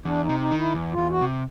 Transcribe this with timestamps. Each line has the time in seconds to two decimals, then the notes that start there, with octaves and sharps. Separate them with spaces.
0.05 E2 D4
0.22 D#4
0.29 C3
0.40 D#4
0.51 D#3
0.57 E4
0.74 E2
0.92 F4
0.98 E2
1.09 F#4
1.21 C3